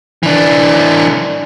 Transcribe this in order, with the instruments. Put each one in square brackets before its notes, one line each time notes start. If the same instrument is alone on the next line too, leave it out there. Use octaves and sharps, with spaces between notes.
[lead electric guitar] E3 D4